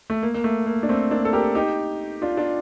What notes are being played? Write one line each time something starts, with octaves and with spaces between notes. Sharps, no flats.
A3
A#3
A#3
A3
A#3
D4
A3 C4
A#3 D4
A4
G4 A#4
D#4 G4
D4 F4
D4 F4